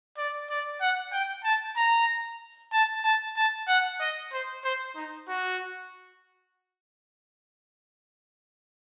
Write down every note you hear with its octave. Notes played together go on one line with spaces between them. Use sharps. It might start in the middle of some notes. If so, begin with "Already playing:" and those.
D5
D5
F#5
G5
A5
A#5
A5
A5
A5
F#5
D#5
C5
C5
D#4
F#4